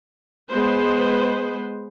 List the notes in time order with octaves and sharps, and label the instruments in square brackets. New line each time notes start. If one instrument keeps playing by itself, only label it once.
[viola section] G#3 B3 B4 C5